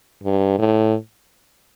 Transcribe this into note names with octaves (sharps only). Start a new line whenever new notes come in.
G2
A2